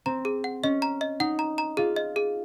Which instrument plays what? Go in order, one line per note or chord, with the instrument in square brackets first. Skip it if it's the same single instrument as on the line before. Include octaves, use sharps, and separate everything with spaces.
[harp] C4 [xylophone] A#5
[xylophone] G#4
F#5
[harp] C#4 [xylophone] D#5
[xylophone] A#5
D#5
[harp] D#4 [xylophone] F#5
[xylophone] A#5
A#5
[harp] F4 [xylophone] G#4
[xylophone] D#5
G#4